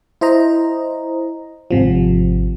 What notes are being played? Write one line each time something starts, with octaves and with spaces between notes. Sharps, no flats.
E4 C5 D#5 A#5
G#1 C3 F3